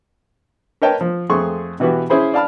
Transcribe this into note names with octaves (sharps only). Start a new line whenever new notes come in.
A#4 B4 C#5 D#5 G5 A5
F3
F2 A3 G#4 C6 C#6
B2 E3 B3 F#4 G4
C#4 E4 G#4 C5 B5
D5 F5 A5 B5 F6